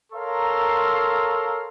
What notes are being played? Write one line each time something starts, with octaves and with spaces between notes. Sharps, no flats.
A4 A#4 C#5 F5 A#5 C6